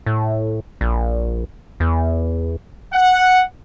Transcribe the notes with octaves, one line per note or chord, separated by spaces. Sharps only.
A2
A#1
E2
F#5